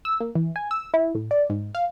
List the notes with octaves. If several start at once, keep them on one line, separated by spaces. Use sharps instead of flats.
E6
A#3
E3
G#5
E6
E4
A2
D5
G#2
F5